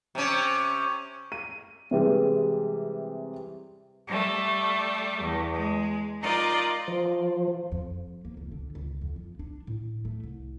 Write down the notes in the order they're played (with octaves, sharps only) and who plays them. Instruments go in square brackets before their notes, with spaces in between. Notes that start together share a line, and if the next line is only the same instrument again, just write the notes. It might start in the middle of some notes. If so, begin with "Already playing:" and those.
[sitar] C3 C#4
[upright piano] D#7
C3 E3 G3 G#3
[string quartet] G3 A3
E2
G#3
D#4 F4 A#4 D5 D#5
[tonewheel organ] F3
[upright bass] F2
A#3
C#2
D3
C#2
F2
F3
D4
A2
A3
C2